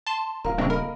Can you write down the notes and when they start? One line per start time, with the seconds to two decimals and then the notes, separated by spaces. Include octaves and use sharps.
0.07 A5 C6
0.45 D1 F4 A#4 F5 A#5
0.58 G2 C#3 G#3 A#3 C4 D4 C#6
0.70 A4 A#4 D#5 F5 B5